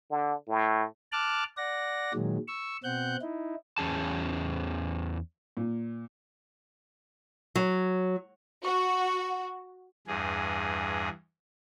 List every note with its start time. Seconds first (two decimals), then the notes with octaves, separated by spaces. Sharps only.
0.11 D3
0.48 A2
1.12 A5 D6 F6 F#6
1.57 D5 F#5 A#6
2.14 A#2 D#3 F#3 G#3
2.48 C#6 E6
2.84 B2 C4 F#5 F#6 G6
3.21 D#4 E4
3.78 E2 C#4 G#4 A5
5.57 A#2
7.55 F#3
8.65 F#4 C#6
10.07 E2 G2 G#4